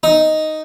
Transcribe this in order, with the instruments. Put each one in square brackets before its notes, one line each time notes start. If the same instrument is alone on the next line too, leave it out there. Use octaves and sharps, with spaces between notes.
[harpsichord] D#4